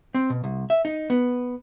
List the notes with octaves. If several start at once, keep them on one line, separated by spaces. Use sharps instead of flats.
C4
B2
C2
E5
D#4
B3